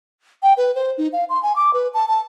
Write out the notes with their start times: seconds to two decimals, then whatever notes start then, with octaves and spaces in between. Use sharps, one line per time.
0.43 G5
0.57 B4
0.75 C5
0.98 D#4
1.13 F5
1.29 C6
1.43 G#5
1.56 D6
1.74 B4
1.94 A5
2.08 A5